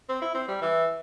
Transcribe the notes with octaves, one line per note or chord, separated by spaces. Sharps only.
C4
E4
C4
G3
E3